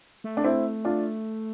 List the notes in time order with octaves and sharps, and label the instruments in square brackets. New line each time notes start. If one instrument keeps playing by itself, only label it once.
[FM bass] A3
[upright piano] D4
C4 E4
D4 F4